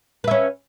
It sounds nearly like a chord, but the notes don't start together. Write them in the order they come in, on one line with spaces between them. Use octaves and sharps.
B4 E5 C#4